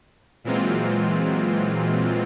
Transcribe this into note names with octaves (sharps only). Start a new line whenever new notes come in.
A#2 E3 F#3 G#3 C4 F4